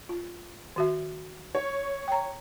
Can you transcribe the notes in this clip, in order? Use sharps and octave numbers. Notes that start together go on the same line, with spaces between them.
F4
D#3 F#4 E5
C#5
G5 A#5